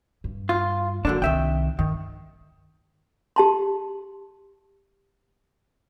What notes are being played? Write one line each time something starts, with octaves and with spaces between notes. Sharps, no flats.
G2
F4
F#2 D3 A#3 D4
C2 D#3 E5 G5
G2 D#3
G4 A5 C6